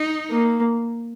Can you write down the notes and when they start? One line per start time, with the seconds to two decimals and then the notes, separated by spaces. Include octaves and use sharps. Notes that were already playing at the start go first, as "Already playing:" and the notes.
Already playing: D#4
0.30 A#3